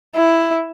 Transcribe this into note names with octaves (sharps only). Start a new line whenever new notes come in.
E4